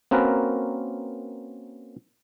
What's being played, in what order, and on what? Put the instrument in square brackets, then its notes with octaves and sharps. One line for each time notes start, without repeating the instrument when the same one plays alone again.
[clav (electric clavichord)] A#3 C4 C#4 F#4 A#4 B4